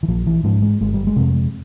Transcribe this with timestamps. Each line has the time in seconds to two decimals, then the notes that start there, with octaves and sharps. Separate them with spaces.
0.03 E3
0.08 A#1 F3
0.26 E3
0.44 G#2 F3
0.62 G#3
0.81 G1 G#3
0.94 G3
1.07 G#3
1.16 F2 C3